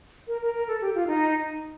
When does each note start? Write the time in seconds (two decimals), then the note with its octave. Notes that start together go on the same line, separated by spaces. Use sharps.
0.28 A#4
0.42 A#4
0.54 A#4
0.68 A4
0.81 G4
0.95 F4
1.07 D#4